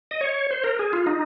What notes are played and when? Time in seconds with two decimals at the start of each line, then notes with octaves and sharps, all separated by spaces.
0.11 D#5
0.21 C#5
0.51 C5
0.64 A#4
0.79 G#4
0.93 F4
1.07 D#4